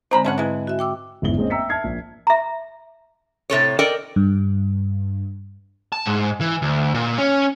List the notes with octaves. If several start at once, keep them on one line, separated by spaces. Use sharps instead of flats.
D3 G#3 C4 C5 A#5 B5
G#2 A3 C#4 F#5 A5
E3 G#3
F#4 E5
G5 D6 E6
G1 E2 G#2 E4 F#7 G7
G#3 A#3 C4 C#4 D#5
E5 G5 A#5 E6 B6 C#7
E5 A5 F6 G#6 C7
A#1
E5 A#5
A2 C3 A4 C#5
A4 A#4 D5 D#5 G5
G2
A5
G#2
E3
D2
A#2
C#4